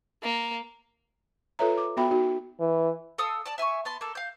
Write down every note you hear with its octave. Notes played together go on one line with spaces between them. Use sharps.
A#3
F4 A4 B4 C#5 E5 A#5
D6
B3 F#4 E5 G5 B5
D#4 F#4
E3
A4 F5 D#6 E6
D5 A5
E5 G#5 B5 C#6
B3 A5 C6
A#3 A4
F5 G6